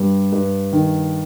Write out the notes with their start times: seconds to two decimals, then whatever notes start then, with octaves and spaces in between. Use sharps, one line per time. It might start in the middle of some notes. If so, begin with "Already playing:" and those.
Already playing: G2 G3
0.33 G2
0.72 D#3